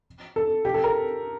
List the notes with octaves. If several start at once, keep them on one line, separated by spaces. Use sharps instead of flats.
A4
G4
A4
A#4